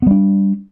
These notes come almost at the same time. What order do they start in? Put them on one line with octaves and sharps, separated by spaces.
B3 G3 D4